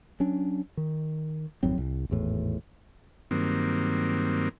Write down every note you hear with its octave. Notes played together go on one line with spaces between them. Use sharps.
F#3 C#4 D4
D#3
G#1 F2 F#3 C4
C2
G#1 E2 A2
G2 D#3 F#3 A#3 C4